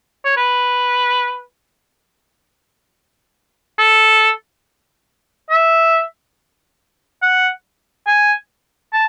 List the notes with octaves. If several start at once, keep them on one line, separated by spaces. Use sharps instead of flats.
C#5
B4
A4
E5
F#5
G#5
A5